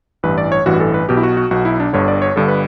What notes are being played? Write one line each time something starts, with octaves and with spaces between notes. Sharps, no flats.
A1 G2 E3 B4
D5
C#5
A1 G2 E3 F#4
A4
B4
B1 B2 G4
E4
F#4
F#4
B1 B2 F#4
E4
D4
G1 G2 D3 C#5
D5
C#5
G1 G2 D3 A4
B4